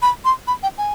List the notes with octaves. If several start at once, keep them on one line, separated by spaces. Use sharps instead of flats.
B5
C6
B5
G5
G#5